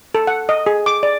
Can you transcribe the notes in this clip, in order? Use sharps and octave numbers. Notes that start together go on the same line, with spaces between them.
A4
F#5
D#5
G#4
D6
D5